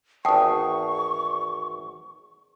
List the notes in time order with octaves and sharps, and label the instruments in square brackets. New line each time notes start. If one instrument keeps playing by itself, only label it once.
[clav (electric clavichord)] G#1 E2 [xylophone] G5 A5 D#6 [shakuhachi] C#6